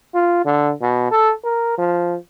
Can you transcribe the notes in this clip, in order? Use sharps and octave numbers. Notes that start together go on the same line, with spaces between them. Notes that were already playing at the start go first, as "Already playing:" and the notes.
F4
D3
B2
A4
A#4
F3